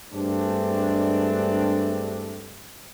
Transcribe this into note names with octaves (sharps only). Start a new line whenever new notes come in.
G2 G#3 A3 C4 D4